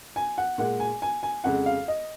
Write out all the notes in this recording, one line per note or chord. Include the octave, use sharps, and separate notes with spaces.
G#5
F#5
A#2 G#3 F#5
G#5
G#5
G#5
F2 C#3 G#3 F#5
F5
D#5